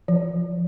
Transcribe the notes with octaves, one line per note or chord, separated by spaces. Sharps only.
F3